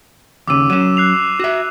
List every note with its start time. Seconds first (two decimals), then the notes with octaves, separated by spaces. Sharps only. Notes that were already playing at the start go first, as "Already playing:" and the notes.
0.47 D#2 C#3 D6 E6 D#7
0.70 F#3 C#4 D#7 E7
0.97 F#6 C7 F7
1.40 F#4 E5